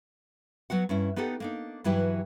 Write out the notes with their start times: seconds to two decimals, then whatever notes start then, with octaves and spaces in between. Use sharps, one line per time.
0.70 F#3 B3 F#4 F#5
0.89 G2 C#4 E4
1.16 B3 D#4 G4 A4 F#5
1.40 A#3 D4 D#4
1.84 G2 E3 F#3 E4 G4 B4